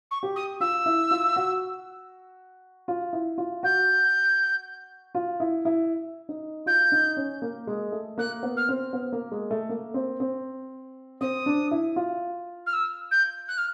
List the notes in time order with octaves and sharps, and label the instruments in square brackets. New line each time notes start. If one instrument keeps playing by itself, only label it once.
[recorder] C#6
[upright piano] G4
[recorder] D#6
[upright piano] F4 [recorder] E6
[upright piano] E4
F4
F#4
F4
E4
F4
[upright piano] F#4 [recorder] G6
[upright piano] F4
E4
E4
D#4
[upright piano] F4 [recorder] G6
[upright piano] D#4
C#4
A#3
G#3
A3
[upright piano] A#3 [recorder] F#6
[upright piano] B3
[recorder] F6
[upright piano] C4
B3
A#3
G#3
A3
A#3
C4
C4
[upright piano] C4 [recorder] D#6
[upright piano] D4
E4
F4
[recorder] F6
E6
G6
F#6
F6